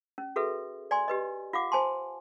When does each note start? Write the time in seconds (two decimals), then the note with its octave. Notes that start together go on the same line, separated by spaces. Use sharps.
0.18 C#4
0.36 F#4 G#4 A4 B4 E5
0.91 D5 G#5 C6
1.08 G4 B4 D#5
1.53 F4 F5 F#5 D6
1.72 C5 G#5 A5 C6